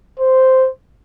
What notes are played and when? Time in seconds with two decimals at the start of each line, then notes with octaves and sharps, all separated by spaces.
0.20 C5